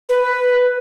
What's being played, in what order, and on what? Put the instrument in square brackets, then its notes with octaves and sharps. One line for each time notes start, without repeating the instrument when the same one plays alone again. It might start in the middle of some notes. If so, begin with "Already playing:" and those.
[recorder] B4